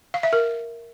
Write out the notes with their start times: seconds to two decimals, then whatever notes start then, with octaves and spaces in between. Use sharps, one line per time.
0.14 F5
0.23 E5
0.33 A#4